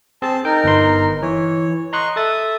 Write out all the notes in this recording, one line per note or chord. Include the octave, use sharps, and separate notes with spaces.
C4 G#4 A5
D#4 A#4 G5
G1 B4 C6
E3 C#5
D#5 A#5 C6 C#6 F#6
A4 E5 D#6 A6